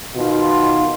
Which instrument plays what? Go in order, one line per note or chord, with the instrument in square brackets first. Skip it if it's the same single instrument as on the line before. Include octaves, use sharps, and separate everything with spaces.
[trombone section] B2 D#3 F4